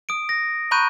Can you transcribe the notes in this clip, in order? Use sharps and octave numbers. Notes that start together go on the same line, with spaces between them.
D#6 D7
A#6
A#5 B5 C#6 F#6 G6 D#7